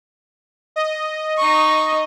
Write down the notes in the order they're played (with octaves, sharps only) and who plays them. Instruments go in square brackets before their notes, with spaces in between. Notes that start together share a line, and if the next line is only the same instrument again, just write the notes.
[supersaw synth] D#5
[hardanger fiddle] D#4 C#6